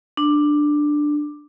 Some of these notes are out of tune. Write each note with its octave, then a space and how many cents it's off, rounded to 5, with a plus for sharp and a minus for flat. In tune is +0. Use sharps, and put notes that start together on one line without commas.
D4 +10